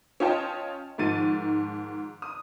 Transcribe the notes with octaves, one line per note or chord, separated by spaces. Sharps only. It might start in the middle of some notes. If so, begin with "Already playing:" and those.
C#4 F4 D#5 G5 A5
G#2 D#3 F3 A6 D#7
D#6